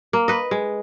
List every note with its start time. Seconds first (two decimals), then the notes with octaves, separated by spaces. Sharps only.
0.13 A#3
0.28 B4 D#5
0.51 G#3